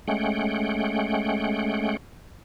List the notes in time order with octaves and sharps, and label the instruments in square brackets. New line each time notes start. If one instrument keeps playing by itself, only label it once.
[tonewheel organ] G#3 A3 C#4 F#5 G5